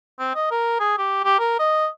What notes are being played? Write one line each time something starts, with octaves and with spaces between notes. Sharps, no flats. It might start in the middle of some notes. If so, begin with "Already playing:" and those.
C4
D#5
A#4
G#4
G4
G4
A#4
D#5